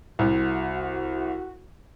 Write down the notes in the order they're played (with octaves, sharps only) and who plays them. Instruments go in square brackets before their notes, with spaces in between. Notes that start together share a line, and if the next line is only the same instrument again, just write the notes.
[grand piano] C2 [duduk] F#4